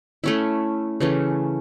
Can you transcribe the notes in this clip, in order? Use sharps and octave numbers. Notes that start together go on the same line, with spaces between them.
A3 C#4 E4
C#3 E3 A3 C#4